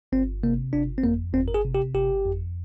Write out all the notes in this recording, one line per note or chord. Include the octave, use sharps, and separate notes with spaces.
G1 C4
C3 A#3
G1 D4
C4
F2 A#3
G1 C4
A#4
G#4
C3
G4
G1 G4
F2